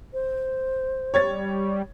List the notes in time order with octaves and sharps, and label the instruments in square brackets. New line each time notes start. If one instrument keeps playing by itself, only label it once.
[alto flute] C5
[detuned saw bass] G3 [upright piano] C#5 G#6 A6